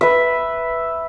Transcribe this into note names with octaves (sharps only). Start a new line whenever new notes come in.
B4 E5